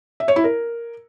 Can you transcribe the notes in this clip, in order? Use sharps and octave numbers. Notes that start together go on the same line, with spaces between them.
E5
C#5
E4
A#4